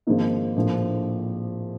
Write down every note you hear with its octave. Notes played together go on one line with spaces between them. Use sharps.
G#1 G#2 F3 A#3 D#4
A#1 A2 F3 A#3